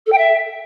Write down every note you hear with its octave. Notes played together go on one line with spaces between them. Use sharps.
A4
G5
E5